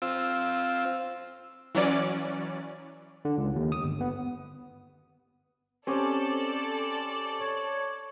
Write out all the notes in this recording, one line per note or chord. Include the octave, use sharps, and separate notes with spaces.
C4 F4 E6
E3 F#3 C#4 D5
D3
C#2
D#2
D#6
G1
B3
C4 C#4 G4 A4 D5
C#5